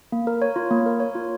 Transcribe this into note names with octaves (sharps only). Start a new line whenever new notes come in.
A#3
A#4
C#5
F4
A#3
A#4
C#5
F4